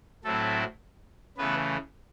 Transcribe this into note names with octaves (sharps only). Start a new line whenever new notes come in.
A2 F#3 A3 C4 E4 A4
C#3 E3 A3 B3 B4